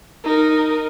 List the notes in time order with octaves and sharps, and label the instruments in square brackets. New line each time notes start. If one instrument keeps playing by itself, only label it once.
[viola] D#4 A#4